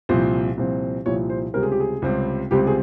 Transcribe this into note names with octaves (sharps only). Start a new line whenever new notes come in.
C2 A#2 F3 C4 C5
C2 A#2 F3 C4
C2 A#2 F3 C4 C#5
C5
C#2 C3 G3 C4 A#4
G#4
G4
G#4
C#2 C3 G3 C4
C#2 C3 G3 C4 G4
G#4